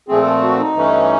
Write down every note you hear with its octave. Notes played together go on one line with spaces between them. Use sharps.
A#2 F3 A3 C4 G#4
A4
F#4
D#4
G2 E3 A3 C#4